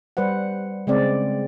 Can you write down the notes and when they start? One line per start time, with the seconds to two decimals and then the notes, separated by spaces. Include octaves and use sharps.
0.17 G3 B4 C5 F#5
0.87 C#3 G#3 C4 D5